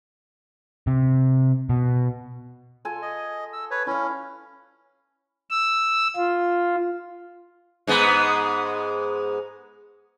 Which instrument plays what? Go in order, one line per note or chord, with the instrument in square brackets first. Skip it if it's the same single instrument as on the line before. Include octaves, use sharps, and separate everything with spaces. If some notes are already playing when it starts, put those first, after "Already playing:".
[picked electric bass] C3
B2
[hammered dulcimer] F4 A4 G#5
[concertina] D#5
E6
B4 C#5
[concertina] C#4 [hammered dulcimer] E4 F5
[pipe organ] E6
F4
[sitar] G#2 G#3 B3